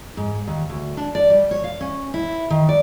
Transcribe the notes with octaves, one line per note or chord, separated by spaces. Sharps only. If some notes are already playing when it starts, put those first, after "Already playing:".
G#2
D#2
D2
D4
D5
G3
C#5
F5
C#4
E4
D#3
D5